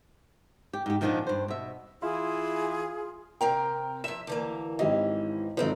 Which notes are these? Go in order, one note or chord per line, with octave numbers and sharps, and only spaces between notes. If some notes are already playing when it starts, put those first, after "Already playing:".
G4
G#2 G4
A#2 D#3 F3 A#3 B3 D4
G2 C5
B2 E5
E3 E4 F4 G#4
C3 C4 A#4 G5
F2 E5 E7
D2 E3 A#3
G#1 E3 C#4 G4 D#5
G#1 F3 C4 D#4 A4 B4